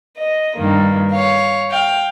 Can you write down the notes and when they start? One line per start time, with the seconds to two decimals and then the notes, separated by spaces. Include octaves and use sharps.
0.17 D#5
0.56 G2 D#3 A#3
1.12 C#5 F5
1.70 F5 G5